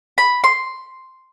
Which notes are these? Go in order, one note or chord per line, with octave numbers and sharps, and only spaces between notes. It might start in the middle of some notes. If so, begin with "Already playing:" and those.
B5
C6